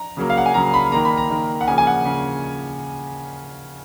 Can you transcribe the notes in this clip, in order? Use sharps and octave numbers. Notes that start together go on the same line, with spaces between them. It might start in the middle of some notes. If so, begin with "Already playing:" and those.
Already playing: A#5
C#3 F#3 A#3
F5
F#5
G#5
C#3 F#3 A#3 A#5
B5
D#3 A#3 A#5
B5
A#5
D#3 A#3
F#5
C#3 F3 A#3 G#5
G#5
F#5
C#3